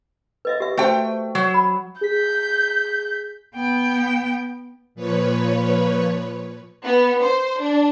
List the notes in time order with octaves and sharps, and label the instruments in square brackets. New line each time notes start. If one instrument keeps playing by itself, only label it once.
[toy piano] B4 D#5 E5
G4 E5
[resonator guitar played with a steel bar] A3 G5 [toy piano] F#4 C5
[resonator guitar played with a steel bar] F#3
[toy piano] B5
[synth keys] G#4 B6 [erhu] G6
[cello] B3 G5
[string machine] A#2 F3 B4 C#5
[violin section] B3
C5
D4